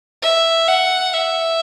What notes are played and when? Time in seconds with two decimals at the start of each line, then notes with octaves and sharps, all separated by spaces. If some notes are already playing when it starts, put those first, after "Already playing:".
0.22 E5
0.68 F#5
1.14 E5